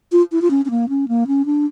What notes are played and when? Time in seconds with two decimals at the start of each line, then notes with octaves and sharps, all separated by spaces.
0.12 F4
0.32 E4
0.42 F4
0.50 C#4
0.65 C#4
0.70 A#3
0.89 C#4
1.08 A#3
1.27 C#4
1.46 D4